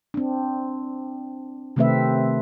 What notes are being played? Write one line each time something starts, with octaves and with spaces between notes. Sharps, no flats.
C4 D4
C3 D#3 A3 C4 B4 E5